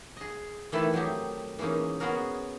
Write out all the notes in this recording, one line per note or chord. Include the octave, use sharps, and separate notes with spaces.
G#4 D#5
D#3 E3 A3 E4 A4 B4
F#3 C4 D#4 G4
E3 G#3 A#3 C#4 D#4
B3 C#4 F#4 G#4 A#4